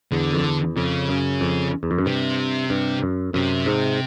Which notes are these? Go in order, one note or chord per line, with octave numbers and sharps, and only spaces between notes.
E2 D3
F2
E2
F2 C#3
F#2
F2
E2
F2
F#2
G2 C3
G2
F#2
F#2 C3
G#2